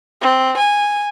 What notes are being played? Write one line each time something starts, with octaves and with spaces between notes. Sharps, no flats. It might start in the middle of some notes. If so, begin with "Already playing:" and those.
C4
G#5